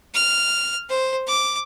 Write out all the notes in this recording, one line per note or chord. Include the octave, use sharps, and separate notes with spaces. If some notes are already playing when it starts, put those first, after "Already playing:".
F6
C5
D6